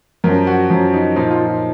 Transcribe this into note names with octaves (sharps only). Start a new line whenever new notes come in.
F#2 F3 A#4
F#4
F#2 F3
D#4
A#2 F3 D#4
F4
F4